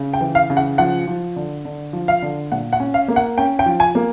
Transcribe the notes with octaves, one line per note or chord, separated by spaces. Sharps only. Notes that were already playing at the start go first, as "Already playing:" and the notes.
Already playing: C#3
G5
E3
F5
C#3
F#5
F3 F#5
F3
D3
D3
F3
F5
D3
A#2 F#5
F#5
C#4
F5
A#3
F#5
C#4 G5
G5
F3
G#5
A#3